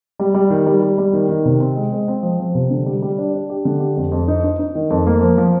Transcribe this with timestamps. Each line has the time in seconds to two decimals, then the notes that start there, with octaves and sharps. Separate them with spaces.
0.19 G3
0.34 G3
0.50 D#3
0.66 G3
0.82 G3
0.98 G3
1.13 D#3
1.29 D#3
1.45 C3
1.60 C4
1.76 G#3
1.93 G#3
2.08 C4
2.23 F3
2.40 F3
2.55 C3
2.70 D3
2.86 G3
3.02 G3
3.18 D4
3.34 D4
3.50 G4
3.65 D3
3.80 G4
3.97 F2
4.12 F2
4.28 D#4
4.44 D#4
4.59 D#4
4.75 D#3
4.90 F2
5.07 A#3
5.22 F3
5.38 F3